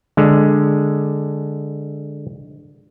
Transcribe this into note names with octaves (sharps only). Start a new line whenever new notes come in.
D3 G#3